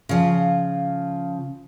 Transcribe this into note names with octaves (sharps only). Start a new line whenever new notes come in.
C#3 F3